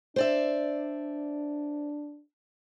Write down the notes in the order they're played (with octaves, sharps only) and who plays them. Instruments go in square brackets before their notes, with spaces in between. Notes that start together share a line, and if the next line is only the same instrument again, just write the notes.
[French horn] D4 [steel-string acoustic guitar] C5 D5 E5